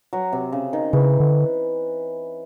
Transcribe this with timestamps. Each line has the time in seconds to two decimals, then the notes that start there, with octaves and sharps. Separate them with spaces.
0.13 F#3
0.33 C3
0.52 C#3
0.73 D#3
0.93 C#3 E3
1.20 D3